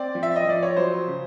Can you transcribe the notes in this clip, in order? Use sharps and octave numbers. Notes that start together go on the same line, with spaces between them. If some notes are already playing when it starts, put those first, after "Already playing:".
Already playing: C4 D5
F3
E5
D#5
F3 D5
C#5
F#3 C5
C#3